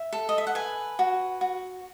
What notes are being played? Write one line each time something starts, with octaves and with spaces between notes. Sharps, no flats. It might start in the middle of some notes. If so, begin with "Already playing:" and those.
Already playing: E5
A4
D#5
E5
F#5
B4 G#5
F#4
F#4